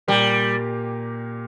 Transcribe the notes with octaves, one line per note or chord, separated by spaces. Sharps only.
A#2 G3 A#3 G4